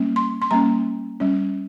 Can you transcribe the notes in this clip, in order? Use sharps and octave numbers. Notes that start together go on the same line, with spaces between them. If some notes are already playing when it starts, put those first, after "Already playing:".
Already playing: G3 A#3 C#4
C6
C6
G3 A#3 C#4 A#5
G3 C#4